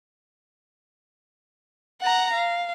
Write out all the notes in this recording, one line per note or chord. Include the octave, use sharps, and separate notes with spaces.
F#5 A#5
F5